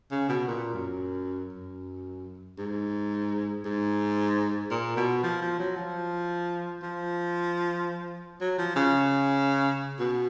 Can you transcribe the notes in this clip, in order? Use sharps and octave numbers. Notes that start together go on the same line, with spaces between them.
C#3
B2
A#2
F#2
F#2
G#2
G#2
A#2
B2
F3
F3
F#3
F3
F3
F#3
F3
C#3
B2